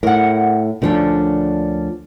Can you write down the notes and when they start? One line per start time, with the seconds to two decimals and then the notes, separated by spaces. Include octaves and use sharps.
0.03 A2 A#4 F#5
0.82 D2 A#2 D3 F3 C#4 D4